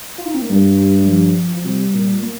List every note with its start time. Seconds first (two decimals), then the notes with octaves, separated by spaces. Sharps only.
0.18 F4
0.26 D#4
0.34 C4
0.42 A#3
0.50 G2 G3
1.01 G3
1.07 F3
1.56 F3
1.64 C3 G3
1.94 A#2
2.22 A#3